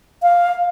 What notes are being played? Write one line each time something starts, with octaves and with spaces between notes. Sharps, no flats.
F5